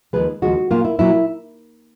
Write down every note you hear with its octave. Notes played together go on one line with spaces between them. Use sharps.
D#2 C#3 F3 G#3 B4
D#2 C#3 F3 G#3 F#4
A#2 F#3 A#3 F4
E4
A#2 F#3 A#3 E4